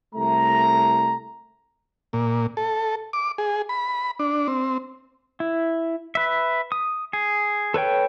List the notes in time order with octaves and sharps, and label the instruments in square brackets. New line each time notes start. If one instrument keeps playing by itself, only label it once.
[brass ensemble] C2 A3 A#5
[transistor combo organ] A#2
A4
D6
G#4
B5
D4
C4
[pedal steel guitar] E4
B4 E5
D#6
G#4
A4 B4 C#5 G5